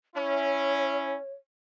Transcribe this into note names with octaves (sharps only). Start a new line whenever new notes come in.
C#4 E4 C#5